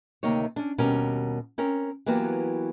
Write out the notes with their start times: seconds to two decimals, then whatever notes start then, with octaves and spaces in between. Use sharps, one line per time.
0.23 D2 C3 D#3 A#3 D#4 C#5
0.56 C#4 D4
0.78 D#2 B2 G3 C#4 A#4
1.58 C4 C#4 A#4
2.06 E3 F#3 A#3 B3 F#4 G4